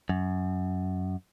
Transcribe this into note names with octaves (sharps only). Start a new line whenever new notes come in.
F#2